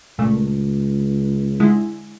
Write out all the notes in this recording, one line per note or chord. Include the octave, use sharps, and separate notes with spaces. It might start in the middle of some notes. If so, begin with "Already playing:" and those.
C#2 A#2 A3
D3 G#3 E4